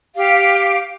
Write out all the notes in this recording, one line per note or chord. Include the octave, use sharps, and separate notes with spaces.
G4 F5